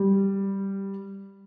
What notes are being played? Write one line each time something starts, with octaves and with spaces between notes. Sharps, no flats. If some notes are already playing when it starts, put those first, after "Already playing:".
Already playing: G3